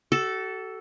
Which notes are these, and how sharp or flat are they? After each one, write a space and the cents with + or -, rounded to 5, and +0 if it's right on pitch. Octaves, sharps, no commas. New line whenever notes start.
F#4 +40 A4 +0